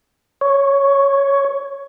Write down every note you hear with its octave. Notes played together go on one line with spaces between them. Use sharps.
C#5